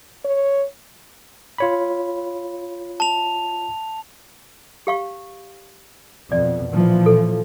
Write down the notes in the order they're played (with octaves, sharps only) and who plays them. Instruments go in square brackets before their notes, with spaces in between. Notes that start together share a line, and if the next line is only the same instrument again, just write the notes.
[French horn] C#5
[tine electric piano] F4 C#5 B5
[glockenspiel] A5 F7
[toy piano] G4 F5 C#6
[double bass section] F2 B2 [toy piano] D5
[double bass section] A#2 E3 F3
[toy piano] A4